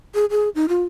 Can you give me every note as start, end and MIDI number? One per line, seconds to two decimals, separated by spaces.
0.15 0.25 68
0.30 0.49 68
0.55 0.66 63
0.69 0.84 65